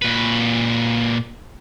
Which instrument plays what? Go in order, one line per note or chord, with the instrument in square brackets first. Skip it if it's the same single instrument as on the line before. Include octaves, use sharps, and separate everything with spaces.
[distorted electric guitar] A#2 B4